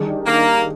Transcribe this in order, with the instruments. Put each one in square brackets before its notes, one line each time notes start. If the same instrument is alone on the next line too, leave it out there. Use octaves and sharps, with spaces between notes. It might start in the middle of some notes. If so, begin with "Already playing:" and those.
Already playing: [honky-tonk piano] D#3 G3 D4 G#4
[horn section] A#3